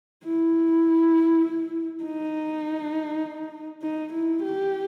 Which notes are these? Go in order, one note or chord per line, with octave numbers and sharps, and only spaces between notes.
E4
D#4
D#4
E4
G4